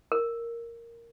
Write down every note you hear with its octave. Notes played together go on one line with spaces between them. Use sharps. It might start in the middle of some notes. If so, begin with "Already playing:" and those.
A#4